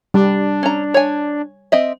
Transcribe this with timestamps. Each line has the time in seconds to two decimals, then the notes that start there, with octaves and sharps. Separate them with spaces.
0.14 G3 D4
0.63 C#4 A#5
0.94 C#5 G#5
1.72 C4 D#5 E5